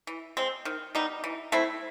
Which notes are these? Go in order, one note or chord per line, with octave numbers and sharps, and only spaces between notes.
E3
G#3 C4
D#3
G3 B3 D#4
E3
A3 C4 E4